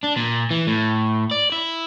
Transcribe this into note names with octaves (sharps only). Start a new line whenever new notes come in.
D4
A#2
E3
A2
D5
E4